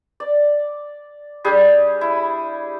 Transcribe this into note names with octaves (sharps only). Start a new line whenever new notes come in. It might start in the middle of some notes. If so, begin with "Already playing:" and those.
D5
G3 D4 G4 G#4
E4